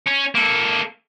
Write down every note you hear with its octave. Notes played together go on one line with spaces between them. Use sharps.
C#4
A#3 A4